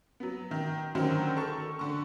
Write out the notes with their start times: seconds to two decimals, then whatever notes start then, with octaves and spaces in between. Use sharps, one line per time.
0.20 F#3 B3
0.51 D#3
0.95 D3 D#3 F#3 C#4 A#4 C5
1.37 A4 C#6
1.79 D3 C#6